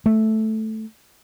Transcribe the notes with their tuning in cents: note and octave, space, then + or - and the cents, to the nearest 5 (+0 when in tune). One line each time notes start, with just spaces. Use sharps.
A3 -5